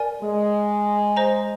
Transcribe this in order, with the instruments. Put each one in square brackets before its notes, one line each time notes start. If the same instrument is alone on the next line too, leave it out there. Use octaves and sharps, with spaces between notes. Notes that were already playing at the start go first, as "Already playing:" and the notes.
Already playing: [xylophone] A#4 D5 G#5
[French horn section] G#3
[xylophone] C5 D#5 A#5